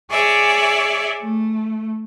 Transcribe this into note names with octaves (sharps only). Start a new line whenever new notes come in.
G#4 C#5 D5 E5
A3